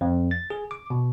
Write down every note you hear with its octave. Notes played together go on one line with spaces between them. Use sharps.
F2
A6
G#4
D6
B2